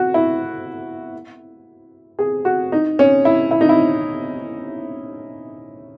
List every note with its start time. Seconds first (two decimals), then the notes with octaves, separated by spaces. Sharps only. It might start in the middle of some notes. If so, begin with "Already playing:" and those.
Already playing: F#4
0.14 E4
2.19 G#4
2.45 F#4
2.72 D#4
2.99 C#4
3.25 E4
3.51 E4
3.61 D#4
3.69 E4